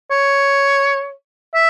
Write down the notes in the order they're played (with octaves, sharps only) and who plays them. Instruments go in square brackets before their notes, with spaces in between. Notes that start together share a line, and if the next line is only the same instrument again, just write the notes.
[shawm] C#5
E5